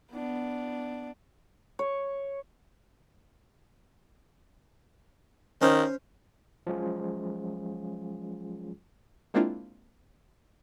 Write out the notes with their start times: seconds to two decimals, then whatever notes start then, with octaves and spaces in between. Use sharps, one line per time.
0.12 B3 D4
1.79 C#5
5.62 D#3 C#4 C5
6.67 F3 F#3 G#3 C#4 F4 G#4
9.34 G#3 A#3 C4 D4 E4 F4